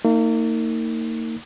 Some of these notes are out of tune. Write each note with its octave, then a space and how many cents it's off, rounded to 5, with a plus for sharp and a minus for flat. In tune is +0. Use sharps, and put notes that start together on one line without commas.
A#3 -35 D#4 +20